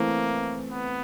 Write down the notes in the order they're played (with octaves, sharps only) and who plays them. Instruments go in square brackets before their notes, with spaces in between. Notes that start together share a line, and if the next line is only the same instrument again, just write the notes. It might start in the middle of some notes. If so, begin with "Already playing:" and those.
Already playing: [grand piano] E3 A3 C4 [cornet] A#3
[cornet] B3